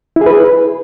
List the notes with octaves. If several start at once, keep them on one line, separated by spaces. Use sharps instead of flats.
E4
G#4
B4